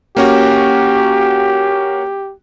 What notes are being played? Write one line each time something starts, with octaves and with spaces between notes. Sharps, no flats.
A#3 C#4 F#4 G4